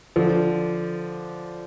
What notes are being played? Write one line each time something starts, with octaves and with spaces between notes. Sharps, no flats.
D3 F3